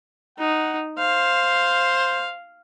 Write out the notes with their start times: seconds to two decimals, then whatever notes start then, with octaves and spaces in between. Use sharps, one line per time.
0.39 D#4 F#5
0.99 C5 F5